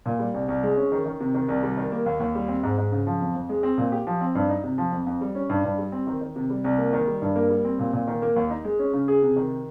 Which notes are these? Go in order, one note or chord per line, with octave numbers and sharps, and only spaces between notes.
A#2
G3
C2
C2
G#3
C#4
D#3
D#3
C3
D#3
C2
G3
D#3
A#3
D#2
D#2
G3
C4
G#2
G#2
C#3
F3
F2
F2
G#3
C4
A#2
G4
F3
C4
G2
D#4
C3
F3
F2
F2
G3
C#4
G2
G2
G3
C4
D#3
D#3
C3
G3
C2
A#3
D#3
G3
G2
A#3
G3
C4
A#2
A#2
D#3
A#3
D#2
D#4
G#3
C#4
C#3
G#4
C3
D#3